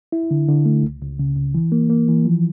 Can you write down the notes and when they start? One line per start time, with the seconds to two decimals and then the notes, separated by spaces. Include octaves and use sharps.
0.12 E4
0.31 D3
0.48 D3
0.65 A3
0.83 C#2
1.02 C#2
1.19 C#3
1.36 C#2
1.55 E3
1.72 A#3
1.89 A#3
2.08 E3
2.25 F3